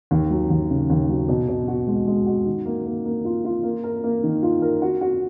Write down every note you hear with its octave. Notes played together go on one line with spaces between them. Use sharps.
D#2
F#3
D#2
C#3
D#2
F#3
B2
B2
F#4
G#3
G#3
F#4
D#3
A#3
A#3
A#3
F4
F4
A#3
A#4
A#3
D#3
F4
A#4
F#4
F#4